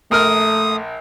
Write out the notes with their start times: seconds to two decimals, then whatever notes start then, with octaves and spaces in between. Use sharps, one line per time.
0.11 A#1 A3 A#4 D#6 F6